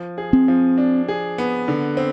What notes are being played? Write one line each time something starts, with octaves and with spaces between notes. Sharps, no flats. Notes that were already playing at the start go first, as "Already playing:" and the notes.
Already playing: F3
G#4
C4
F3
D4
G#4
B3
D3
C4